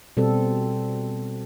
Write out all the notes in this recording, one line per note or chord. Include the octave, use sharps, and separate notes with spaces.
B2 G3 C4 A4